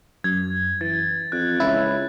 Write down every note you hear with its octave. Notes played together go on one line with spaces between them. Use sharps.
F#2 G#6
E3 A6
F2 F#6
C#2 E4